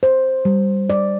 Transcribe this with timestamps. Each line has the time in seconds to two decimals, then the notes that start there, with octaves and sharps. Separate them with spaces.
0.03 C5
0.45 G3
0.90 D5